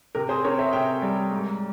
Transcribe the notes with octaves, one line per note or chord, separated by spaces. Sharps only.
C3 A#4
G#4 C5
C4 A#4 C#5
C5 E5
C3 E5 G5
G3
G#2